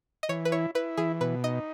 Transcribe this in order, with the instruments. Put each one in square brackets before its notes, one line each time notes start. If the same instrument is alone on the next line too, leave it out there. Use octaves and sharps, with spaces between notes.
[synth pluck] D#5
[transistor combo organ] E3 [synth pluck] C#5
[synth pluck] B4
[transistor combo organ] E4 [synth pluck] C#5
[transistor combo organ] E4 [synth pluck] B4
[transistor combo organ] E3 [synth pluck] G#4
[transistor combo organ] B2 [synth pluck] B4
[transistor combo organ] D#4 [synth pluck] D#5